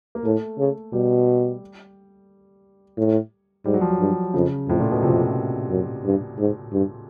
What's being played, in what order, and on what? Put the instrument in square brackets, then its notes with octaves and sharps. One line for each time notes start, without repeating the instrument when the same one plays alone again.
[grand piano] A#3
[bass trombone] A2 [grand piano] A3
[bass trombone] C#3
[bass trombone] B2 [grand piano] G3
[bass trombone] A2
[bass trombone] G#2 [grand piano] G3
[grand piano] F#3
F3
F#3
[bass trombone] G2
[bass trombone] F2 [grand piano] C#3
[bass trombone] F2 [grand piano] A2
[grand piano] A#2
B2
[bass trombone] F2 [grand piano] C3
[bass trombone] F#2
G2
G#2
G2